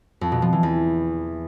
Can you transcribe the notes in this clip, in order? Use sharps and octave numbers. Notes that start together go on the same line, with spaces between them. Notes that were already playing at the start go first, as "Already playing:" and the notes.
F2
B2
F3
E3
E2